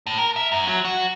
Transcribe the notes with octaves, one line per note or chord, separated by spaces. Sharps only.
A2
A#4
E5
F#2
F#3
F#4